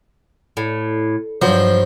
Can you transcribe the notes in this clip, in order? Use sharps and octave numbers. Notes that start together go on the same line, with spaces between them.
A2
G2 F3 F#3